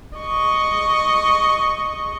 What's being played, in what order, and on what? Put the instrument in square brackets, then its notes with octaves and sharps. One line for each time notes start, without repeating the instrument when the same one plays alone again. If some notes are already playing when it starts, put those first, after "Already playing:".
[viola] D#5 C#6